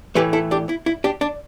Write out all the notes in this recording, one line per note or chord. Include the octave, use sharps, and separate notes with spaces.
A2 E3 A3 G4 B4
E4 A4
D4 G4
E4
E4
D4 G4
D4